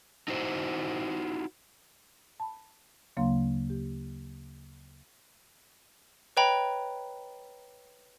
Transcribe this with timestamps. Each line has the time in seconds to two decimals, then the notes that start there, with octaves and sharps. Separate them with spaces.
0.28 D#4 E4 F#4 C5
2.40 A5 B5
3.17 D2 C#3 F#3 A#3 F5 C6
3.70 G4
6.37 B4 C#5 D#5 G5 A#5 B5